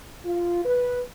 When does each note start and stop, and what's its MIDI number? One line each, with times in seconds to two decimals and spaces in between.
0.25 0.61 65
0.65 1.00 71